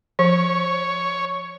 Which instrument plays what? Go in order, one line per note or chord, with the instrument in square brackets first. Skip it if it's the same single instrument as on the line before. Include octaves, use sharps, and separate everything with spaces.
[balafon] F3 [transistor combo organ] C#5